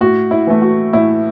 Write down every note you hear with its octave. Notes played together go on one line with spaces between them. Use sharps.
A2 F#4
E4
E3 A3
F#4
A2 E4